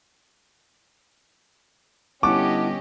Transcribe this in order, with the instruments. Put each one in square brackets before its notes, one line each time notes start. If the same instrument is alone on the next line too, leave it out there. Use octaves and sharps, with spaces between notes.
[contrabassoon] G1 [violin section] C#4 G4 D#5 [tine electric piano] E4 F#5 A5 [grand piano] D6